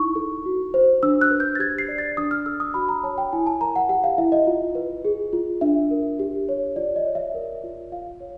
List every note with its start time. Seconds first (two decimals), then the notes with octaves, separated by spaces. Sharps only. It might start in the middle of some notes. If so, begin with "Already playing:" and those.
Already playing: D#4 E4 C#6
0.16 A4
0.46 F#4
0.74 C5
1.03 D4 E6
1.21 F#6
1.31 B4
1.40 G6
1.55 A6
1.59 G4 G#6
1.79 C7
1.88 D5
1.98 A6
2.17 D4 D#6
2.31 F6
2.46 A4 E6
2.60 D#6
2.74 F#4 B5
2.89 A#5
3.03 C#5 A5
3.18 G5
3.33 E4 G#5
3.47 A5
3.61 A#4 A#5
3.76 F#5
3.89 G4 F#5
4.04 F5
4.18 E4 E5
4.32 D#5
4.47 F4
4.75 B4
5.05 G#4
5.33 F4
5.61 D4 E5
5.91 A#4
6.19 G4
6.49 C#5
6.76 F4 D5
6.96 D#5
7.06 C#5
7.15 E5
7.34 A#4
7.64 F4
7.92 F4 F5
8.20 C#5